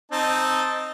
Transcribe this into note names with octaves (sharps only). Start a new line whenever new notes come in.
C4 D#4 A5